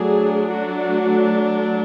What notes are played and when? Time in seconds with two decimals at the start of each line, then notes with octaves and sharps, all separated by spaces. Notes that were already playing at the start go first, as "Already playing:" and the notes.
Already playing: F#3 A3 D4 G#4
0.52 F#4